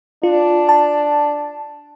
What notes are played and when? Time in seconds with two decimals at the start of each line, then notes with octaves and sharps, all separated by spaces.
0.23 D4 F4
0.69 A5